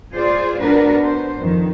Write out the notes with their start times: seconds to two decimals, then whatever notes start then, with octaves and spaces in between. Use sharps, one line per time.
0.13 F4 G#4 C5 D5
0.60 B3 D4 F#4 A#4 B4
1.04 C5
1.41 F2 D#3